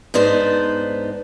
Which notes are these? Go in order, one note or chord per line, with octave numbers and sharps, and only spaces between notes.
G#2 B3 D4 D#4 C5